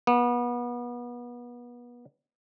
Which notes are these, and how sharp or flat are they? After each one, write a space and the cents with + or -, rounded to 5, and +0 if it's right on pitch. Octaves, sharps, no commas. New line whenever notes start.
B3 -30